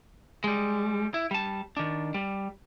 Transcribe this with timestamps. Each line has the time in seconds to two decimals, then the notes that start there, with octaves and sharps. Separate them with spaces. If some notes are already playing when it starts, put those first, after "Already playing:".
0.44 G3 G#3
1.14 E4
1.31 G3 A5
1.77 D#3 D4
2.14 G3